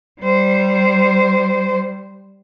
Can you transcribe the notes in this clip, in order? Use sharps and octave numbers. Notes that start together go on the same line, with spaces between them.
G3 C5